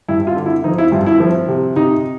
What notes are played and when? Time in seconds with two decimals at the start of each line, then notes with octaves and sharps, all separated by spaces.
0.09 G2 E4
0.27 F4
0.36 D3
0.46 E4
0.64 F3 D#4
0.78 E4
0.92 G2 F4
1.06 E4
1.20 F3
1.48 C3
1.76 C3 D#4